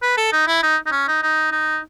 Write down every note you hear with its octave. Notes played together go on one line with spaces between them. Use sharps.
B4
A4
D#4
E4
D#4
D#4
C#4
D#4
D#4
D#4